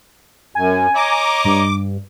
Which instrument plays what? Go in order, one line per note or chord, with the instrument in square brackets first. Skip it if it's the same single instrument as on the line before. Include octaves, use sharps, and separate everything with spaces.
[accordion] F#2 [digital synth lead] G#5
[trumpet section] C#5 D#5 A#5 [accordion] D6
[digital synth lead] G2